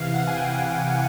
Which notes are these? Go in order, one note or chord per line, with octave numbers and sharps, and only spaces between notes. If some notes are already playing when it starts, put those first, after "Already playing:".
Already playing: C3 E3 F5
F#5
G#5
G5